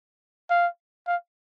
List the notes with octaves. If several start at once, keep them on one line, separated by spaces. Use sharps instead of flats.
F5
F5